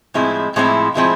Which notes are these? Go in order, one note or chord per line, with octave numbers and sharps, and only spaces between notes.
A2 F3 G#3 C4 E4
A2 F3 G#3 C4 E4
A2 F3 G#3 C4 E4